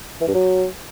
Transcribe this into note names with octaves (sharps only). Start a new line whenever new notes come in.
E3
G2
F#3